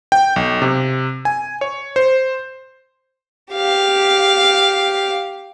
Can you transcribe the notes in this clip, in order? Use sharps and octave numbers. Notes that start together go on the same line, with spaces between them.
G5
B1
C3
G#5
C#5
C5
G4 F5